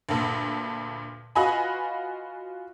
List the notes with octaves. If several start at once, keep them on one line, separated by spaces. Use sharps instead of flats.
D2 G2 A#2
F4 F#4 B4 D#5 G#5 B5